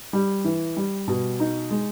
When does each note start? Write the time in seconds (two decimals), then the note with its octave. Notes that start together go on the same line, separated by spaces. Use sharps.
0.13 G3
0.44 E3
0.77 G3
1.08 B2
1.40 D#4
1.71 G#3